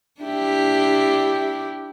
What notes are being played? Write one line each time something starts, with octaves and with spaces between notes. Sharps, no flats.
D4 E4 G4